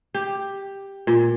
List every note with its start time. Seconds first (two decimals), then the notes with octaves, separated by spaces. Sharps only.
0.14 G4
1.07 A#2